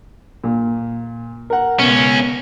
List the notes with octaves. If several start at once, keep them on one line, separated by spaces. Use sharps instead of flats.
A#2
A#4 F#5
C#2 B2 C#4